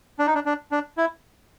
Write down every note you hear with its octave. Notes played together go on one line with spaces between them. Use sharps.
D4
D#4
D4
D4
D4
E4